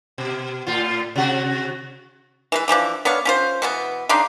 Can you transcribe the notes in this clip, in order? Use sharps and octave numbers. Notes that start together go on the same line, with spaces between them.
B2
A2 F4
C3 F#4
E3 G#3 B4
D3 E3 F3 D4
B3 D4 C#5 F5
C#4 F4 C5
B2 E3 B3
C#3 D4 D#4 C6